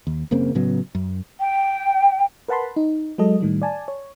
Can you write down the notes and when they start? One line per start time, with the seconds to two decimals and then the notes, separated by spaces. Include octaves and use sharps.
0.07 D#2
0.31 F#1 C#3 A#3 C4
0.55 A2 C#3 F#3 B3
0.95 F#2
1.40 G5
2.48 A#4 B4 F#5 A5 B5 C6
2.76 D#4
3.18 F#3 G#3 A4 D#5
3.41 A2 D#3 G3
3.62 D5 G#5 A5
3.88 C#5